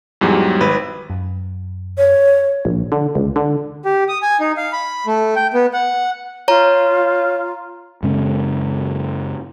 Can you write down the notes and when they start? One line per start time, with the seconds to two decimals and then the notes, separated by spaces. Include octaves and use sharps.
0.21 E2 G#2 F#3 G3
0.61 G#1 B4
1.10 F#2
1.98 C#5
2.65 A#1
2.92 D3
3.15 C#2
3.36 D3
3.85 G4
4.08 D#6
4.22 G#5
4.40 D#4
4.57 F5
4.73 B5
5.06 A3
5.36 G5
5.54 B3
5.73 F#5
6.48 F4 C#5 A#5
8.03 F#2 C#3 G#3 C#4